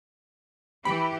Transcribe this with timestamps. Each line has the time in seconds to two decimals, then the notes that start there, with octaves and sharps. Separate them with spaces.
0.85 E3 G4 B5